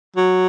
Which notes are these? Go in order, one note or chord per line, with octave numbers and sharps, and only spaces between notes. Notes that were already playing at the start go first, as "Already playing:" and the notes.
F#3